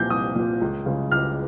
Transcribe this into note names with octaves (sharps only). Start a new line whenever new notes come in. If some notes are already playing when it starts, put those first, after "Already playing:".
Already playing: C2 A#2 F3 G6
C2 D#6
A#2 F3
C#2
C#3 G#3
C#2 F6